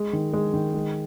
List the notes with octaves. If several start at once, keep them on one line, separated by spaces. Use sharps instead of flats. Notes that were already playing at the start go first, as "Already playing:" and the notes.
Already playing: G#3
D#3
G#3
D#3
G#3